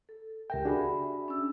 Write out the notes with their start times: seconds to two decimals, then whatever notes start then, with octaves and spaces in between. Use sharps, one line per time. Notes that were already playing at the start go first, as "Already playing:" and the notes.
0.09 A4
0.50 C#2 G4 A#4 E5 G5
0.65 D4 F#4 G#4 E5 B5
1.28 C#4 E6